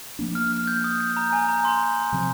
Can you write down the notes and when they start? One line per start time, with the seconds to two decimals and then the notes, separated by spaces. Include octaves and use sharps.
0.19 F3 A#3 D4
0.35 F6
0.52 F6
0.67 G6
0.84 D#6
1.00 G6
1.17 A#5
1.33 G#5
1.49 A#5
1.65 C6
2.12 C3 F3 C4